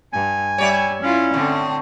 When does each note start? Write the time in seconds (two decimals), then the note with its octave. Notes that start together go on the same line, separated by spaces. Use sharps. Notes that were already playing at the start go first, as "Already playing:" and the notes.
0.13 G2 G#5
0.58 G3 C#5 D5 E5
1.02 C#4 E4 F4
1.34 A2 D3 C4